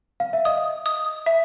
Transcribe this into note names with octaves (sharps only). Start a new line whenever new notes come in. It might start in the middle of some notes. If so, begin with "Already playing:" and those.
F5
E5
D#5 D#6
D#6
E5